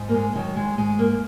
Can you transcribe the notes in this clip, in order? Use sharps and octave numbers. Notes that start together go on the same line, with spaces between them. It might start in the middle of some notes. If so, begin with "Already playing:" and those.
Already playing: G#2
A#3
G#3
D#3 F#3
G#3
G#2 G#3
A#3